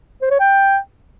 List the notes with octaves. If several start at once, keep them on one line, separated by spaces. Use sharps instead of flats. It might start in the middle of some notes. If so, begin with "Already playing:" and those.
C5
C#5
G5